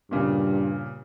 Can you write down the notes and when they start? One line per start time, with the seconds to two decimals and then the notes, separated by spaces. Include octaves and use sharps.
0.11 G2 A#2 C#3